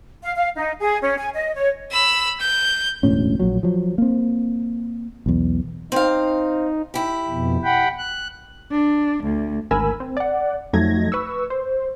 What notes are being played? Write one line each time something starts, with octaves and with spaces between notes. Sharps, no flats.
F5
F5
D#4
G#4
C#4
G#5
D#5
C#5
B5 E6
G6
E1 D2 A2 C#4
A#1 A#2 F#3
F3 F#3
A#3 C4
B1 E2
C4 D#4 F5
E4 G4
F2 B2
F#5 G5 B5
F#6
D4
D2
G#1 D2 A#4 G#5 B5 E6
C4
D5 F#5
F2 F#3 A3 D#4 G#6 A#6
B4 C#6 E6
C5